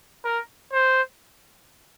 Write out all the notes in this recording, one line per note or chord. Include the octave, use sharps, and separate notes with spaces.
A#4
C5